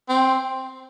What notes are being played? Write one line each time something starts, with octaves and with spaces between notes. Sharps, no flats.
C4